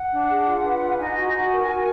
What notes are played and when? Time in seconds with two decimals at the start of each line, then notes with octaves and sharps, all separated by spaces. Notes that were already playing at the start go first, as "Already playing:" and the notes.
Already playing: F#5
0.11 D4
0.28 G#4
0.45 F4
0.64 B4
0.80 F4
0.98 D#4 G#5
1.15 F#4
1.33 F#4
1.50 A#4
1.67 F#4